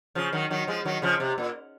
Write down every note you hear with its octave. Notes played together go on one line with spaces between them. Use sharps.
C#3 F3
D#3 F#3
D#3 F#3
F3 G#3
D#3 F#3
C#3 F3
C3
A#2